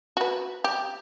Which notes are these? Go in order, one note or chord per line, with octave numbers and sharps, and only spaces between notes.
F#4 B4
G4